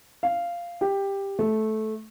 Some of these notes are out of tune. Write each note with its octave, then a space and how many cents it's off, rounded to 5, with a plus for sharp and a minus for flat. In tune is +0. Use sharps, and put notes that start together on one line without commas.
F5 -10
G4 +10
A3 -15